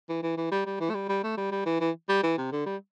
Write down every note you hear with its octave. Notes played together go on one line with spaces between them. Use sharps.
E3
E3
E3
G3
G3
E3
A3
G3
G3
A3
G3
G3
E3
E3
G3
E3
C3
D3
G3